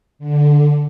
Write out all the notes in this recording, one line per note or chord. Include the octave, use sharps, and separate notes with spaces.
D3